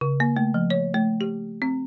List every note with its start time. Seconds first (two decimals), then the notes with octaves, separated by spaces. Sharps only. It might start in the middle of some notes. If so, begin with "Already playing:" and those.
0.01 C#3
0.20 A#3
0.37 A3
0.54 F3
0.70 C#5
0.94 A3
1.21 G4
1.62 C4